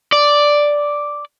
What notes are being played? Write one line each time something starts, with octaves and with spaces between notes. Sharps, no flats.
D5